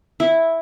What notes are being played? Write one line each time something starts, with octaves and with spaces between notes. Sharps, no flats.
E4